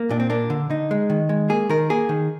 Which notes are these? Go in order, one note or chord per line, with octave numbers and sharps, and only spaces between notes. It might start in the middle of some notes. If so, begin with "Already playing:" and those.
Already playing: A#3
A#2 D4
C4
A#3 D4
D3
D3 D#4
G#3
D#3
G#3
A#3 G#4
D#3 A#4
A#3 G#4
D#3